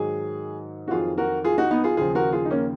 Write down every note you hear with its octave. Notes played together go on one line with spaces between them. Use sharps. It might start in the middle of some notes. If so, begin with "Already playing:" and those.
Already playing: G#2 D#3 F#3 G#4
F#4
F2 D#3 F#3 F4 G#4
F#4 A#4
F4 G#4
D#4 F#4
B3 D#4
F4 G#4
D#2 C#3 F3 F4 G#4
F#4 A#4
F4 G#4
D#4
A#3 C#4